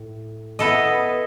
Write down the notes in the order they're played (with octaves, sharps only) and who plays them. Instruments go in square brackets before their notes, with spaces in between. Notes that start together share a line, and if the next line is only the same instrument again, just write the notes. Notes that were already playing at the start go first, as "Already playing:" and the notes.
Already playing: [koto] A2
B3 E4 A4 D#5